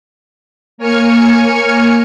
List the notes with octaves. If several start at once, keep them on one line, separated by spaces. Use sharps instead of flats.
A#3 C#5 G#5 F6 G#6 C#7